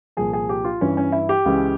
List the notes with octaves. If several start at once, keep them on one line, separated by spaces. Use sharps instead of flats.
C2 A#2 F3 G#4
G#4
G4
F4
G2 E3 C#4
C#4
E4
G4
C#2 C#3 E3